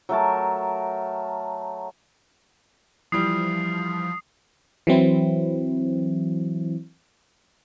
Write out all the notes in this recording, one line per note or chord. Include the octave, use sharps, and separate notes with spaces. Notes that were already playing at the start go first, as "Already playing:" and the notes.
F#3 A3 A#4 A5
E3 F3 G3 D#6 C7
E3 F#3 C4 E4